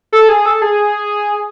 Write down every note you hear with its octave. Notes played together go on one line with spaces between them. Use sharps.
A4
G#4
A4
G#4